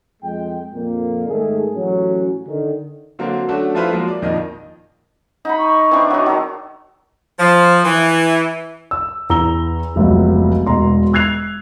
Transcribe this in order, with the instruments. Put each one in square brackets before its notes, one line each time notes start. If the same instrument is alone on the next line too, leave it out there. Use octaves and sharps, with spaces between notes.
[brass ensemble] F2 G#3 G5
F2 A#2 A#3
G#2 D#3 A3 G#4
A1 F#3 C#4
D3 D#3
[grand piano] D3 F#3 A#3 C4
F#3 A3 C#4 D4 F#4
F3 A3 E4 F4 B4 C5
F3 F#3 G#3 A#3
D5
A#1 F2 D#3 D#5
[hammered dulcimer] D#4 B5 [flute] F#5
[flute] C#6
[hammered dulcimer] E3 C4 D4
F#3 D#4
D#3 F#3
[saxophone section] F3
E3
[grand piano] E6
E2 A#5 E6 G7
F1 C#2 F#3 B3
E1 B2 A#5 C6
E6 F#6 G#6 C7 F7